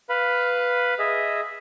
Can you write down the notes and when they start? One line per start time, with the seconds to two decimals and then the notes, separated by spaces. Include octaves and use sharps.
0.09 B4 F5 B5
0.99 G#4 D#5 E5